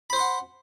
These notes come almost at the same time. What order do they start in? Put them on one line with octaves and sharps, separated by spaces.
B5 C5 C6 F#5